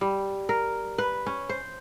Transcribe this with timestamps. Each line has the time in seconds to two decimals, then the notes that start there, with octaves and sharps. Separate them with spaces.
0.01 G3
0.49 A#4
0.98 B4
1.26 C#4
1.49 C5